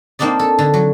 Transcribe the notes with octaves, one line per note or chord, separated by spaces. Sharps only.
A#3 C4 D4 D#4 D5
A4
D3
F#3